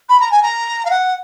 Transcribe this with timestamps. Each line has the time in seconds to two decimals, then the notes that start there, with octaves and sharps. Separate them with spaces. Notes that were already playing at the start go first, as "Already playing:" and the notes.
0.09 B5
0.20 A#5
0.31 G#5
0.42 A#5
0.85 F5
0.90 F#5